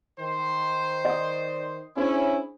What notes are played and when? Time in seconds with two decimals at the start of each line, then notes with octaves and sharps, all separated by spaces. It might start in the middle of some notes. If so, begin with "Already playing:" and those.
0.18 D#3 C5
1.05 D5 D#5 D#6
1.97 C#4 D4 E4 G#4 C5